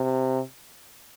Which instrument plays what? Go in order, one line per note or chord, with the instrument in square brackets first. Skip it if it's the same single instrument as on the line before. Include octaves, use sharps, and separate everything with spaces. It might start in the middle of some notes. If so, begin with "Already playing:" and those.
Already playing: [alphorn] C3